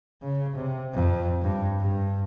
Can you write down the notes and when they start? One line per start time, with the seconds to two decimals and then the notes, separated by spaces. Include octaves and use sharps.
0.23 C#3
0.56 C3
0.93 F2
1.42 G2
1.79 G2